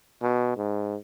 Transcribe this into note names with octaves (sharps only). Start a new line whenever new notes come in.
B2
G#2